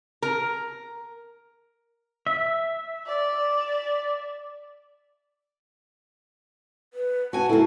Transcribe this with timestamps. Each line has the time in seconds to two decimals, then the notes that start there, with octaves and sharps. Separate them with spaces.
0.22 A#4
2.27 E5
3.06 D5
6.94 B4
7.33 F#4 G#5 A5
7.49 A#3 E4 A4